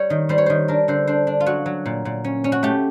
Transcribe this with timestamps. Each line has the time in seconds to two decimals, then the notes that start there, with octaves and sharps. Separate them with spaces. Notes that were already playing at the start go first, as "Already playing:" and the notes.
Already playing: G3 C#5
0.10 D#3
0.29 G3 C5
0.38 C#5
0.46 D#3 C5
0.68 D4 A#4
0.88 D3 C5
1.07 D4 C5
1.27 D4
1.40 F4
1.46 F#3 F#4
1.66 F#3
1.86 A#2
2.05 A#2
2.24 C#4
2.44 C#4
2.52 F#4
2.63 A3 G4